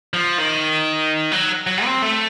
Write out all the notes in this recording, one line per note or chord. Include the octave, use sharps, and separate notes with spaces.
F3
D#3
F#3
F#3
C4
A3